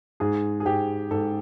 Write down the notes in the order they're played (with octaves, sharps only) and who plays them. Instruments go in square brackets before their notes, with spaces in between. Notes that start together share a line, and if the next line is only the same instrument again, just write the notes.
[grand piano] G#2 [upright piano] G#4
[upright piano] G#4
[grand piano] G#2 [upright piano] G4
[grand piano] G#2 [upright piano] A4